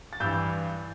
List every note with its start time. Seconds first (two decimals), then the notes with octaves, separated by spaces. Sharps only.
0.13 A6
0.20 G2 E3 E6 G6